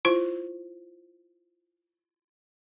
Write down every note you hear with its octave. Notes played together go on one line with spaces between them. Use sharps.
E4 F4 C5